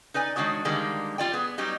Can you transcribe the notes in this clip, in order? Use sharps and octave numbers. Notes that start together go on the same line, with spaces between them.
D#4 B4 D5 G#5
D#3 G#3 D4 F#4 C#5
D3 D#3 G3 G#3 A#3
G3 F4 D5 G5
B3 G#4
F#3 G3 B3 D#4 G4